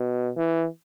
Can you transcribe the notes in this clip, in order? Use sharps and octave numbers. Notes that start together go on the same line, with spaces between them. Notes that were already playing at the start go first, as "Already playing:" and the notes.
Already playing: B2
E3